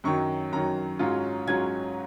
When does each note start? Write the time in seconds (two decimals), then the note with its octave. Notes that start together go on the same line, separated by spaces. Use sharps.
0.04 F#2 D#3 F#3 C#6
0.52 F#2 D#3 F#3 A#5
0.99 G#2 F#3 C#4 F4
1.47 G#2 F#3 C#4 F4 G#6